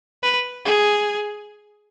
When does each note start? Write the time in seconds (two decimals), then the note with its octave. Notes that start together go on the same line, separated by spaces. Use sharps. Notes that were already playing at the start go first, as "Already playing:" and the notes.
0.23 B4
0.66 G#4